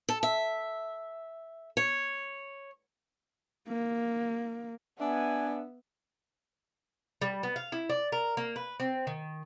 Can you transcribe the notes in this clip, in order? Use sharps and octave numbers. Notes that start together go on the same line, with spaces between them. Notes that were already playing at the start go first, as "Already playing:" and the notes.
A4
E5
C#5
A#3
B3 D4 E5 G#5
G3
B3
F5
E4
D5
A#4
A#3
B4
C4
D#3